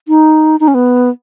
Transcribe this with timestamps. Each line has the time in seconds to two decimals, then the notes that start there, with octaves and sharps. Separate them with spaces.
0.08 D#4
0.60 D#4
0.68 C#4
0.74 B3